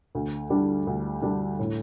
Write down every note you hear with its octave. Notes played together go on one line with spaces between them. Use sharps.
D2
D3 G3 D4
D2
D3 G3 D4
A2